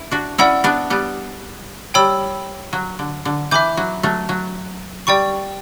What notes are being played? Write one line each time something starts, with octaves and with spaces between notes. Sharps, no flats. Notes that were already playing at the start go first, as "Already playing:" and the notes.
Already playing: E4
D4 F#4
C#4 E4 D5 F#5 B5 E6
B3 D4
G3 B3
G3 C#5 G5 B5 E6
F#3
D3
D3
E3 E5 B5 D6 G6
F#3
F#3 A3
F#3
G3 D5 G5 C#6